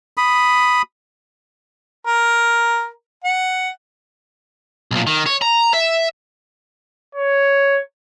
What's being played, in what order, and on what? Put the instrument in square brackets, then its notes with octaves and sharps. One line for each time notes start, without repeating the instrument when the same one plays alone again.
[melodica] B5 D#6
[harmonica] A#4
F#5
[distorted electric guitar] B1 A#2
D#3
C#5
A#5
E5
[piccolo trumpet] C#5